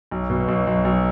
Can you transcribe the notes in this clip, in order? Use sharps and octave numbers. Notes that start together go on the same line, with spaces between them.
B1
B2
B1
B1
B1